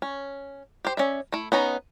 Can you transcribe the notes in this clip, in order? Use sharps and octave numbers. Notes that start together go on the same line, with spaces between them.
C#4
G4 C5
C#4 D5 E5
A3 E4
B3 C#4 D#4 A#5